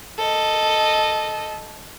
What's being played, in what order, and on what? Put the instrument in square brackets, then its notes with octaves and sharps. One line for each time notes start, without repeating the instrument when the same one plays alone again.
[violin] A4 D#5